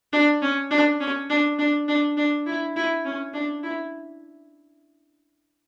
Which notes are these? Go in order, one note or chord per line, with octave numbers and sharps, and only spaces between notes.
D4
C#4
D4
C#4
D4
D4
D4
D4
E4
E4
C#4
D4
E4